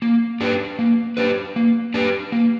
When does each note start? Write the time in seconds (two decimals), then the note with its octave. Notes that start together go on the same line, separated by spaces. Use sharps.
0.02 A#3
0.41 D4 G4 B4
0.79 A#3
1.17 D4 G4 B4
1.56 A#3
1.94 D4 G4 B4
2.32 A#3